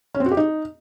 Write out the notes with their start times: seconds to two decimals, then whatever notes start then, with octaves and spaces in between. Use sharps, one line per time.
0.15 C#4
0.20 C4
0.26 F#4
0.31 G4
0.37 D#4